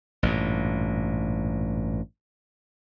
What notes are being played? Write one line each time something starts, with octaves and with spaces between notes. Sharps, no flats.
A1 G2 A#2